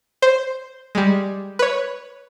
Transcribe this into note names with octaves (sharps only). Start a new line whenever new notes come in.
C5
G3 G#3
B4 C#5